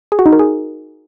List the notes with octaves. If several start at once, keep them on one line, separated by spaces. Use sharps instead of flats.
G#4
F#4
D#4
A#4
G#4